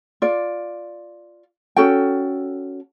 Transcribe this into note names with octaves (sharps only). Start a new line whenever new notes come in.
F4 D5
C#4 F#4 A4 G5